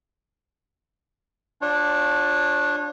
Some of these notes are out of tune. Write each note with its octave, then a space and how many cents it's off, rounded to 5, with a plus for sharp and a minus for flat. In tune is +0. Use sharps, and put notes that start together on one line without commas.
D4 +0 F4 +20 C#5 -30